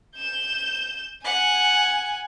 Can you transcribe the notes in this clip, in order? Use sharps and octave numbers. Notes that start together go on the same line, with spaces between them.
G6 E7
F#5 G#5